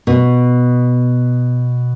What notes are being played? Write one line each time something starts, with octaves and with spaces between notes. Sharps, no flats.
B2